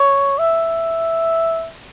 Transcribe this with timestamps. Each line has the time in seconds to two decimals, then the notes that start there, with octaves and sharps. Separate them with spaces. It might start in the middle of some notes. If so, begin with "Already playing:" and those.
Already playing: C#5
0.38 E5